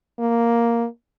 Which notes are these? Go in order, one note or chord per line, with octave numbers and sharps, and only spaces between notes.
A#3